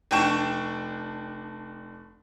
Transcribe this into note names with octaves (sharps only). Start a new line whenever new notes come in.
F1 D4 G5 C#6 E7